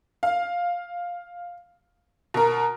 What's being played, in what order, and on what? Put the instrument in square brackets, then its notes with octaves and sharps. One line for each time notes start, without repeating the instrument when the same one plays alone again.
[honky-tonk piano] F5
B2 A#4